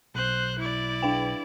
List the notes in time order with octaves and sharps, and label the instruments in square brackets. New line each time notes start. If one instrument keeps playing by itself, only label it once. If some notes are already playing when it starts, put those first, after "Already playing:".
[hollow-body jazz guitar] B1 [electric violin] C5 F#6
[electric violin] E4 D5
[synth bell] D4 B4 G5